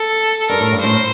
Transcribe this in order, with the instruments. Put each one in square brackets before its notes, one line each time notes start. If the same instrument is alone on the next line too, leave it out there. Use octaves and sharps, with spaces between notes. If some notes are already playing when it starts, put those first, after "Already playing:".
Already playing: [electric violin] A4
[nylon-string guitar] G2 [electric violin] A#4
[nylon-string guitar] A2
G2
[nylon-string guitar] A2 [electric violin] C5